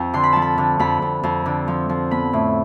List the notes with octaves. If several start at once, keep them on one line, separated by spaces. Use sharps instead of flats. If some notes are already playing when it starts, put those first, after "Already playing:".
Already playing: F2 G5
D3 C6
B5
F3 A5
B5
D3
F2 B5
F2
F2
D3
F3
F3
B3 B5
A2